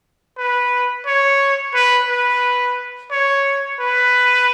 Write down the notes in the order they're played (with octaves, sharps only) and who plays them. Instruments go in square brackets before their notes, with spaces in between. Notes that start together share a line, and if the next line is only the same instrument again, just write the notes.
[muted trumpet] B4
C#5
B4
B4
C#5
B4